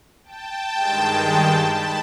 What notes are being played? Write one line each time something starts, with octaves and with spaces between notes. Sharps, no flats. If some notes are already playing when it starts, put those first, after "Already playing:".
G5 A5
G2 D#3 G#3
A5 B5